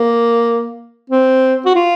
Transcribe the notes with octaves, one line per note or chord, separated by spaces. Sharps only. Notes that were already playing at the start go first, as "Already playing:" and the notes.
Already playing: A#3
C4
F#4
F4